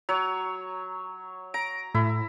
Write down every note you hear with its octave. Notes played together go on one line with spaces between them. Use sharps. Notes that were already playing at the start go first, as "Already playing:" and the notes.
F#3 C#5
A#5 D7
A2 E4